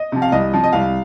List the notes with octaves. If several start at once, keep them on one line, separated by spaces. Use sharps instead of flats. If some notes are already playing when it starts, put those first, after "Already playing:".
Already playing: D#5
C3 F3
F5
C2 D#5
C3 F3
D#5
C2 F5